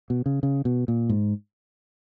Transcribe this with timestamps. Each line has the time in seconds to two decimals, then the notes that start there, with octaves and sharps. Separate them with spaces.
0.10 B2
0.26 C#3
0.43 C#3
0.65 B2
0.88 A#2
1.09 G#2